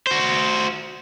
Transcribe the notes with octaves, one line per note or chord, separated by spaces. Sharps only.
F#4 C5